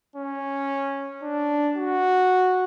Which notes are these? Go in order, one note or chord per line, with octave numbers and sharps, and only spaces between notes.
C#4
D4
F#4